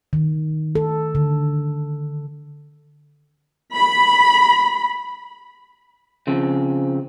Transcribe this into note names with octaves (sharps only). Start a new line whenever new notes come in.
D#3
A4
D3
B5
C#3 F3 C4